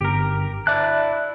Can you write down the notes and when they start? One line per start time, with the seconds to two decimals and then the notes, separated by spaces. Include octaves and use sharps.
0.01 G1 G4 A#4
0.67 E4 D5 E5 A5 F#6